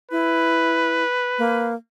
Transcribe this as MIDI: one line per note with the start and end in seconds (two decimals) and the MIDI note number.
0.11 1.03 64
0.11 1.73 71
1.39 1.74 58